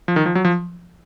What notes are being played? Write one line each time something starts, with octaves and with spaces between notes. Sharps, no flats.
F3
D#3
F3
F#3
F3